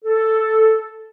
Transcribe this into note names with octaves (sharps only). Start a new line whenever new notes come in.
A4